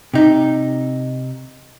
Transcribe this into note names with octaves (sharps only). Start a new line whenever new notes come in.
C3 D#4